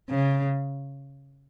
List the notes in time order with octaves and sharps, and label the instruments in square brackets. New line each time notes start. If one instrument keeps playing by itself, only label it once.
[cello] C#3